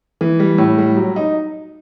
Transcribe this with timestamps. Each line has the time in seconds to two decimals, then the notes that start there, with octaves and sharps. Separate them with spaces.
0.21 E3
0.40 G3
0.58 A2
0.78 G3
0.97 F#3
1.16 D#4